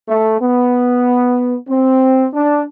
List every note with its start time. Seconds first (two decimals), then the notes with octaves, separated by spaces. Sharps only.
0.08 A3
0.41 B3
1.68 C4
2.33 D4